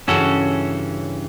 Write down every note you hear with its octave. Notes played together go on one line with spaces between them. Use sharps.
G2 C#3 E3 C#4 F#4 A4